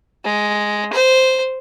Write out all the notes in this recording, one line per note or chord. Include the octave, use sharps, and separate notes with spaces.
G#3
C5